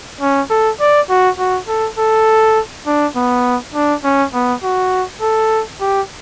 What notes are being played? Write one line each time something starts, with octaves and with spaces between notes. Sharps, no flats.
C#4
A4
D5
F#4
F#4
A4
A4
D4
B3
D4
C#4
B3
F#4
A4
G4